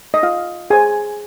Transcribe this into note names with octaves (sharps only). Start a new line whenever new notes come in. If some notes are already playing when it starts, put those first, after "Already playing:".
D#5
F4 F5
G#4 C5 G#5